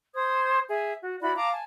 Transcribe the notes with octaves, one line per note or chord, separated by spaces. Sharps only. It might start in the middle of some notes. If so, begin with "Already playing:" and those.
C5 D#6 G#6
G#4 E5
F#4
E4 F#4 D5 B5
F5 A5 A#5 D6
G#5 A5